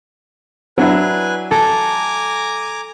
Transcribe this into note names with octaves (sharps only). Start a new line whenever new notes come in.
F#3 D4 E4 B4 G#5
A4 G#5 A#5 D6